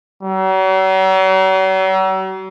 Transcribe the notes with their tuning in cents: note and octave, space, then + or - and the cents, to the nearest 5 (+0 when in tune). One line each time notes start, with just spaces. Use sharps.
F#3 +45